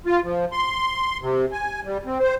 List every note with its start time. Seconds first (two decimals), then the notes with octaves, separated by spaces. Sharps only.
0.06 F4
0.24 F3
0.52 C6
1.21 C3
1.52 G#5
1.85 G3
2.06 C4
2.20 C5